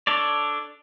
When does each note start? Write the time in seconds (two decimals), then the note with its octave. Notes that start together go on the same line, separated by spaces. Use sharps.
0.07 D4 A4 C#5 D5